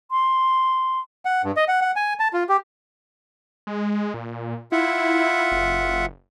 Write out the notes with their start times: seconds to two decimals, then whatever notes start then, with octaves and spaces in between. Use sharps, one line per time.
0.11 C6
1.25 F#5
1.44 G2
1.57 D#5
1.68 F#5
1.81 F#5
1.96 G#5
2.19 A5
2.33 F4
2.49 G4
3.67 G#3
4.14 A#2
4.72 E4 F4 E5 F#5
5.52 F#1